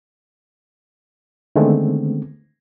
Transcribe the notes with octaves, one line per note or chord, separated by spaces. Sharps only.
D3 D#3 G#3 A3 B3 C4